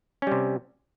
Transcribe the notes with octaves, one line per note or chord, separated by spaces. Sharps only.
C3 G3 C#4